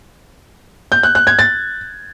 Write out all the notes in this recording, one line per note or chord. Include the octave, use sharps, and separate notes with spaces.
G6
F#6
F#6
G#6
A6